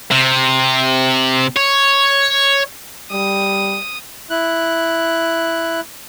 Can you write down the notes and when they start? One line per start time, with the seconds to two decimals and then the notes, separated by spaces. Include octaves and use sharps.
0.11 C3
1.56 C#5
3.11 G3 D#6
4.30 E4 F#6